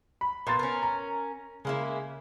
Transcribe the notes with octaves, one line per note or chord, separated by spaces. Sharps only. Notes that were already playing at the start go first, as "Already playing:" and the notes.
B5
A#2 B3 C6 A6
C#4 A#4
A#5
C#3 G#3 A#3 E4